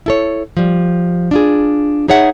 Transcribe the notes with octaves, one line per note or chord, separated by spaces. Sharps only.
E4 A4 C#5
F3 G3
D4 F4 G#4
D#4 G#4 C#5 E5 F#5